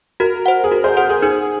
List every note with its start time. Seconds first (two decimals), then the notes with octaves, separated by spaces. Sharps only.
0.20 F#4 A#4
0.46 C5 F#5
0.64 G#4
0.71 F#4 A#4
0.84 G#4 C5
0.97 G#4 C5 F#5
1.09 G#4
1.22 D#4 G#4